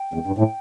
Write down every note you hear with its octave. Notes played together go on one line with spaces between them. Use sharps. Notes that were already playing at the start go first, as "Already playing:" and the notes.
Already playing: G5
E2
G2
A2 G5